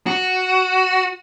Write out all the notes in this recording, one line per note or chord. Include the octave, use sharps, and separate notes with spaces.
F#4